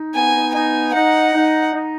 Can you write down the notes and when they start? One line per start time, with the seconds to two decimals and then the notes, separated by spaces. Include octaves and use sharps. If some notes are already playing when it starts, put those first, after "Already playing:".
Already playing: D#4
0.14 B3 G#5
0.54 D#4 G#5
0.94 D#4 F#5
1.34 D#4
1.74 D#4